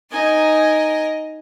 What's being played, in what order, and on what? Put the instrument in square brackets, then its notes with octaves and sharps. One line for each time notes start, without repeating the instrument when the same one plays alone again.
[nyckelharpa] D#4 G#5 [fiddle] A#4 D#5